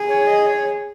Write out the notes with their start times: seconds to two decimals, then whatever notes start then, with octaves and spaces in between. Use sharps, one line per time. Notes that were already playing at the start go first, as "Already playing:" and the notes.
Already playing: G#4
0.09 C#5
0.27 D#5
0.46 C#5